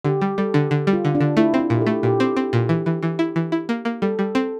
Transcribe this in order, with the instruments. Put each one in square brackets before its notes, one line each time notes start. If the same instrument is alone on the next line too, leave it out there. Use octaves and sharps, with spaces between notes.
[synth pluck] D3 [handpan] G4
[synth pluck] G3
[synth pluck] G3 [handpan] A4
[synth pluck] D3
D3
G3
[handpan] F4
[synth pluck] D3
[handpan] D4
[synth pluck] D3
[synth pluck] A3 [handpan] E4
[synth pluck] C4 [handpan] D4
[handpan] E4
[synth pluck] A#2 [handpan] G4
[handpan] A4
[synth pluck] A3
[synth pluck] A#2 [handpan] G4
[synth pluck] C4
[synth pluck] C4 [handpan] G4
[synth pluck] A#2
[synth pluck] E3 [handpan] G4
[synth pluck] E3
E3
E4
E3
E4
A#3
A#3
[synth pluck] G3 [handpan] A4
[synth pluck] G3
[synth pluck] C4 [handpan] A4